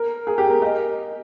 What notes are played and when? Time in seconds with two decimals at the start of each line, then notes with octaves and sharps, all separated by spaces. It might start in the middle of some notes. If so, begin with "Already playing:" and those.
Already playing: A#4
0.27 G#4
0.38 G4
0.50 A#4
0.62 D#5